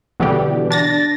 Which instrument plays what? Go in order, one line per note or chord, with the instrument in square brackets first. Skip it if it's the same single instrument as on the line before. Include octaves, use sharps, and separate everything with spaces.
[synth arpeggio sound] B2 D3 E3 G3 B3 G4
D4 A6 A#6